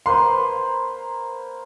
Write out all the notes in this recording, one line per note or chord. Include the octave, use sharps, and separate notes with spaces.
A#3 B4 C5 C6